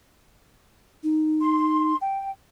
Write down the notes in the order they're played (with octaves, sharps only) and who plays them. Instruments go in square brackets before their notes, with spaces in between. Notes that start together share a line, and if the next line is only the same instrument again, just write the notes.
[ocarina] D#4
[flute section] C6
G5